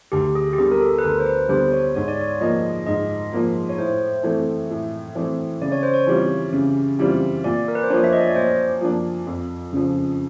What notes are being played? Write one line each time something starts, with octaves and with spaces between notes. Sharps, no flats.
D2 G4
G#4
G4
D3 G3 B3 G#4
A#4
A4
B4
D2 A#4
C5
B4
D3 G3 B3 C5
C#5
G#2 C#5
D5
C#5
F3 A#3 D#5
G#2 D#5
F3 A#3
C#5
A2 C5
E3 A3 C4
A2
E3 A3 C4
C#3 D5
C#5
C5
C#5
E3 G3 C4 F4
C#3
E3 G3 C4 F4
A#2 D5
A#4
B4
C5
F3 A#3 D4 C#5
E5
D#5
D5
C#5
A#2 C5
F3 A#3 D4
F2
C#3 F3